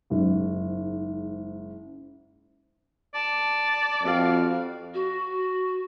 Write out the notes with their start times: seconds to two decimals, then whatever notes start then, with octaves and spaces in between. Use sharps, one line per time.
0.10 F#1 G#2
3.14 D5 A5
4.03 F2 F#4 F5
4.94 F#4